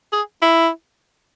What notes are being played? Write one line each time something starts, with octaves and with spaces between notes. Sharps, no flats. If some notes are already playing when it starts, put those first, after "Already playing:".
G#4
E4